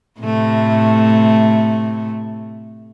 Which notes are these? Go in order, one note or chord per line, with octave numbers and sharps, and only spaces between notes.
A2 C3 A3